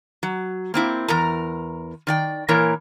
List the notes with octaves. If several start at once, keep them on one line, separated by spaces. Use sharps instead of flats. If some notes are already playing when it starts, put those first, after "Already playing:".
F#3
A#3 C4 E4
E2 A#4 A#5
D#3 D5 G5
A#2 E3 A#3 A#4 C#5 A#5